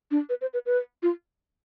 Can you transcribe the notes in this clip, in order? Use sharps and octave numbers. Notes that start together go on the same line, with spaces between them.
D4
B4
C5
B4
B4
F4